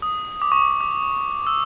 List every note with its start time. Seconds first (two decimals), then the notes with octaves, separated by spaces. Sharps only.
0.02 D#6
0.42 D6
0.52 C#6
0.62 D6
0.71 C#6
0.81 D6
1.47 E6